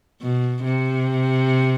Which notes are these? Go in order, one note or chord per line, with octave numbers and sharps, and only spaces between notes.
B2
C3